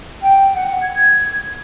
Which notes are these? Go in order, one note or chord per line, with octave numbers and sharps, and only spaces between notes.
G5
F#5
G#6